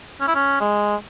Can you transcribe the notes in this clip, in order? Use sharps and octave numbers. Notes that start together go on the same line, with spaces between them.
C#4
E4
C#4
G#3